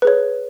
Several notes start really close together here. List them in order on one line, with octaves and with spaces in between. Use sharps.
B4 G#4 C#5